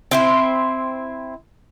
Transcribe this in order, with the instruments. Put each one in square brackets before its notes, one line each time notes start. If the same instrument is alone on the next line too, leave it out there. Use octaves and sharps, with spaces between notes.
[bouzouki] C4 E4 C5